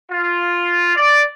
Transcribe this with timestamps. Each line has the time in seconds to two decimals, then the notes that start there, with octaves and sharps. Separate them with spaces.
0.11 F4
0.96 D5